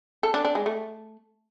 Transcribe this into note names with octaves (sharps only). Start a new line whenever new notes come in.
A4
D4
D4
G#3
A3